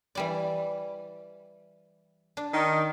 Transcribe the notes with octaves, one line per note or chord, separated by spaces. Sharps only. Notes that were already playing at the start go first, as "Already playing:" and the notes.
E3 G3 D5
D4
D#3